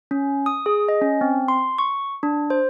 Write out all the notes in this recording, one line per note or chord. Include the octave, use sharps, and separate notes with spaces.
C#4
D#6
G#4
D#5
C#4
C4
C6
C#6
D4
C5